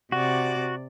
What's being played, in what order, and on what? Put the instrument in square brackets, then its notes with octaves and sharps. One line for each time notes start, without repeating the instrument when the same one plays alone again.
[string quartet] C3 D5 [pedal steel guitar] F#4